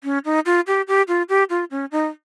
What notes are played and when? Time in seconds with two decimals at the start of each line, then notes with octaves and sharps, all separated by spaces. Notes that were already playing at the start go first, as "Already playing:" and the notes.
0.04 C#4
0.25 D#4
0.46 F4
0.67 G4
0.88 G4
1.08 F4
1.29 G4
1.50 F4
1.71 C#4
1.92 D#4